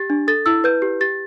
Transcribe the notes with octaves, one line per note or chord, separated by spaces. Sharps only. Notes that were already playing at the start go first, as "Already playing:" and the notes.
Already playing: G4 A6
D4
A4 A6
E4 E6
B4 G6
G4
G4 A6